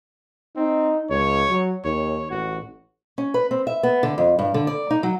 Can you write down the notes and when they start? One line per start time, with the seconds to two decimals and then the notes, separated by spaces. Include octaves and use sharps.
0.57 C4 D#4
1.10 C#2 C#5
1.49 F#3
1.84 D#2 C#5
2.30 A1 F#4
3.18 C#4
3.34 B4
3.51 C4
3.67 E5
3.83 B3
4.03 D3
4.18 F2
4.39 G2
4.54 D3
4.67 D5
4.90 D#4
5.03 F#3